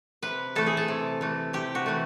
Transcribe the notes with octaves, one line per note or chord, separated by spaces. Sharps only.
C3 B4
E3 A3 A4
G#4
A4
C3
E3 A3
C3 G4
F#4
E3 A3